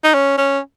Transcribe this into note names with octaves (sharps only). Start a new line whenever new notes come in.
D#4
C#4
C#4